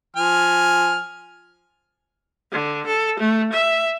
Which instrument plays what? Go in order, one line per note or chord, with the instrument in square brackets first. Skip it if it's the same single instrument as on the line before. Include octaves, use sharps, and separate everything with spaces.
[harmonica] F3 G#5 F6
[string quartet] D3
A4
A3
E5